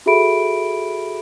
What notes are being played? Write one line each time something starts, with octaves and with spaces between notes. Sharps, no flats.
F#4 G#4 A4 E5 B5 D7